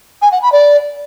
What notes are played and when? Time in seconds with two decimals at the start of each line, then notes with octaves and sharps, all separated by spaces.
0.22 G#5
0.32 F#5
0.42 B5
0.52 D5